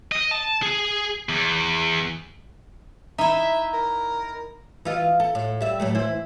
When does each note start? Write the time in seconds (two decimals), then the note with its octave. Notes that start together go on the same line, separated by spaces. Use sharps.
0.12 D#5
0.31 A5
0.62 G#4
1.29 E2
3.18 D#4 E4 E5
3.74 A#4
4.85 E3 F4 D#5
5.20 A4
5.35 A2
5.61 G3 E5
5.80 A2 F#3 A3
5.95 E3 E4 C5